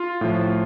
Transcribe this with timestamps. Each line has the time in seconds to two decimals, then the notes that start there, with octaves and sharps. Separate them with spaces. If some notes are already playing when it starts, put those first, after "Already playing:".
Already playing: F4
0.21 A2 F3